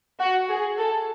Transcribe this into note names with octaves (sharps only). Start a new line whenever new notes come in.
F#4
G#4
A4